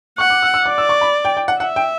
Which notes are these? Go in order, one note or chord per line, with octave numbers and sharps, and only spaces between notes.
F#5 C#6
D6
E6
E6
D5 D6
E6
C#6
B5
G5
G5
F#5
E5 F#5
G5